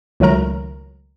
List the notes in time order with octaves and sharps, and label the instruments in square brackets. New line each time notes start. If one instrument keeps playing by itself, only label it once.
[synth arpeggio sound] C#2 D#3 F#3 A3 A#4 A#5